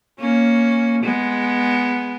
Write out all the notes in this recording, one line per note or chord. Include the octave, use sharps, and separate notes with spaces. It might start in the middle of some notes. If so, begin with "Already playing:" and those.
A#3 C#4
G#3 B3